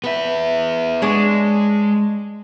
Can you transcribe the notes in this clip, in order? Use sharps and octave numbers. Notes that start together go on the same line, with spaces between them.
B3 B4 E5
G#3 D4 G#4 C#5